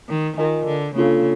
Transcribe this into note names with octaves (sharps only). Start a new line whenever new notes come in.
D#3
D#3 F4 A#4 D#5 G#5
D3
C#3 A#3 D4 F4 A4